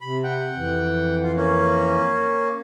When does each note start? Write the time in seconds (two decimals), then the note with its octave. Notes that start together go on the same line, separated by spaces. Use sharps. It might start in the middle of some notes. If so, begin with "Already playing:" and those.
0.01 C3 B5
0.24 F#5 G5
0.56 F2 E3
1.23 F4
1.36 A#3 C#4